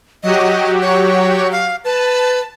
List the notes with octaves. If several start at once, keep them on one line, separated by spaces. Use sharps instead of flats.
F#3 F#4 G4 D#5
C#5
F5
B4 A5